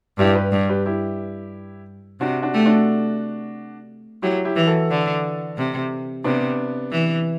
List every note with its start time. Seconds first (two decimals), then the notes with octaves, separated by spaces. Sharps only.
0.18 G2 E4 G4
0.35 G4 B4
0.52 G2
0.69 G4 B4
0.86 E4 G4
2.20 C3 D4 F#4
2.42 D4 F#4
2.54 A3 G4
2.65 D4 F#4
4.22 F#3 E4 G4
4.45 E4 G4
4.56 E3
4.67 F#4 A4
4.90 D3
5.58 C3
6.24 C3 B3 D4
6.92 E3